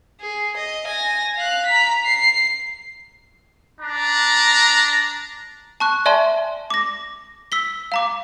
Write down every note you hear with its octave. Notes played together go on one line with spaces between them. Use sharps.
G#4
D#5
G#5 A#6
F5 F#6
A#5 B6
C7
D4 A#5
A5 C#6 F#6
D5 E5 G#5 A5 C6
D6 A#6
E6 B6 G7
F5 A#5 D6